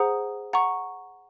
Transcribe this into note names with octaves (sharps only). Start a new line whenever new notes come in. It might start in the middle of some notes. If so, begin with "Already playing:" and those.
Already playing: G#4 C5 F#5 A#5 D#6
F#5 A#5 C#6